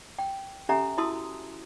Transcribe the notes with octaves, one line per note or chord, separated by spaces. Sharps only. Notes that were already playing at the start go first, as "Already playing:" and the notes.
G5
C#4 G4 A4 E5 G#5 A#5
E4 F#4 A5 C6 D#6 E6